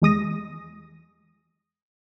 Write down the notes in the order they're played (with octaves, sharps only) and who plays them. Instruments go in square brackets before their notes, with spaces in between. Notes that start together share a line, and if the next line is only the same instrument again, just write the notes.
[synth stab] E2 G#3 D#6 A#6